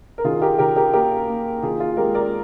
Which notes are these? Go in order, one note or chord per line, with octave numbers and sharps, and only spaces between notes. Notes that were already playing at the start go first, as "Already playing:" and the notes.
A#4
D#3 F4 G#4
G4 A#4
D#3 G4 A#4
G4 A#4
A#3 G4 A#4
A#3
D#3 F4 G#4
F4
G#3 G4 A#4
A#4 D5